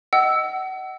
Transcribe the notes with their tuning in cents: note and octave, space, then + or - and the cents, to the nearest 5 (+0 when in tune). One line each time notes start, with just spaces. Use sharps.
D#5 +0 F#5 +30 E6 +0